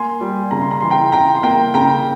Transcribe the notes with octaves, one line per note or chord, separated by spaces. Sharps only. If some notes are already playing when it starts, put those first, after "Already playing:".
Already playing: A#3 G#5 C6
G3
C#3 A#5
C6
A#5
E3 C6
G5 A#5
C#3 G5 A#5
C6
A#3 G5 A#5
C#3 G5 A#5